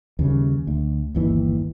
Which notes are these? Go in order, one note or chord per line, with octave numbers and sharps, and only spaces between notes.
D#2 C#3 G3
D2
G1 D#2 E3